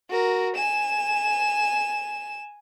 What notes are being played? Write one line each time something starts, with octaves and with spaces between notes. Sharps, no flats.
F#4 A#4
G#5 E7